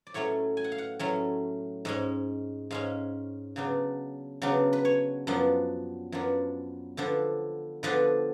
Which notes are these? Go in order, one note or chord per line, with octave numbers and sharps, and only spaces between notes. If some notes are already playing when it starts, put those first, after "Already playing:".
D5
A2 F#3 A3 C#4 C#5
G#5
F#5
F5
F#5
A2 F#3 A3 C#4
G#2 G#3 C#4
G#2 G#3 C#4 F5
C#3 F#3 B3 D4
C#3 F#3 B3 D4
B4
C#5
F#2 F3 B3 D4
F#2 F3 B3 D4
D3 F3 B3 D4
D3 F3 B3 D4 B4